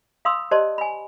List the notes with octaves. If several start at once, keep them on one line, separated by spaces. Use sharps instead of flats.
F5 B5 C6 D#6 E6
G4 C5 D5 D#5 A5 C6
G#5 B5